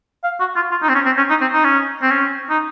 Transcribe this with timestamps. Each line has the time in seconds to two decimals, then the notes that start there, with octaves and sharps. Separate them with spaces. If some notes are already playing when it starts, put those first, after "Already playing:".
0.24 F5
0.40 F#4
0.56 F4
0.71 F4
0.82 D#4
0.89 C4
0.95 C#4
1.05 C4
1.17 C#4
1.29 D#4
1.41 C4
1.53 D#4
1.64 C#4
2.02 C4
2.11 C#4
2.50 D#4